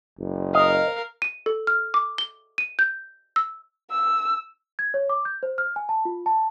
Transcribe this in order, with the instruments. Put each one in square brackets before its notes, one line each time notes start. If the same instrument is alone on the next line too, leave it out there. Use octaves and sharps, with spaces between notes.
[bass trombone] F#1
[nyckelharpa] A#4 F5 [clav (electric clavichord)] D#5
[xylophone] D#7
A4
F6
D6
G7
D#7
G6
E6
[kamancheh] E6
[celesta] G#6
C#5
D6
G6
C5
F6
G#5
A5
F4
A5